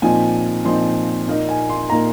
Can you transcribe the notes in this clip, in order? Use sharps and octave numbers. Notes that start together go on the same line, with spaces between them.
A#2 F3 C4 D#4 G#5
A#2 F3 C4 D#4 C6
A#2 A#3 D#4
G#5
C6
A#2 A#3 D#4 A#5